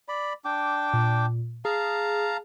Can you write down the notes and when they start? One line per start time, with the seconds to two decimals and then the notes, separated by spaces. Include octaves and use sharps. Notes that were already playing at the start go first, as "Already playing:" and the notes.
0.08 D5 B5
0.45 D4 G5 D6
0.94 A#2
1.65 G#4 F5 A5 A#5